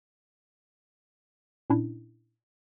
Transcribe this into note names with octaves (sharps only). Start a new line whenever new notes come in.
A#2 C#4 D4 E4